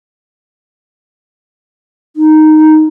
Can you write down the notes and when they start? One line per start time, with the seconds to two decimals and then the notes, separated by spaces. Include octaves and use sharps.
2.16 D#4